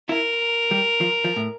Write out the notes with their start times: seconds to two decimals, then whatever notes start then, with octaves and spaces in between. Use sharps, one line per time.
0.09 E4 A#4
0.71 G3
1.01 F3
1.24 F3
1.36 A2